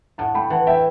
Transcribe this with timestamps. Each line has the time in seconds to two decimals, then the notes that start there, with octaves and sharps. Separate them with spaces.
0.18 A2 F#5 A5
0.35 A3 G5 B5
0.50 E3 F#5 A5
0.67 E4 E5 G5